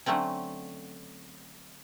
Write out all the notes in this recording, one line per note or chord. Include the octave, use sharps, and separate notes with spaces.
D3 F#3 A3 C4 C#4